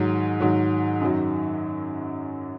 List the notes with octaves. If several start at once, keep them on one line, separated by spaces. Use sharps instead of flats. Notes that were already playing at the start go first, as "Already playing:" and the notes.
Already playing: G#2 D#3 F#3
G#2 D#3 F#3
F#2 D#3 F#3